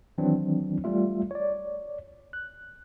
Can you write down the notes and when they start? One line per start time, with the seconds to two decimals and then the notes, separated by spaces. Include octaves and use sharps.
0.18 D#3 E3 F#3 C4 D4
0.84 G3 A3 F4 E5
1.31 C#5 D5
2.33 F#6